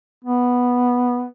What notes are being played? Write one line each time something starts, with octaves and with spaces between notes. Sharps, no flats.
B3